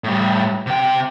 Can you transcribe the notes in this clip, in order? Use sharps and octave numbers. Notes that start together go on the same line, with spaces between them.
A2 G3
C3 G5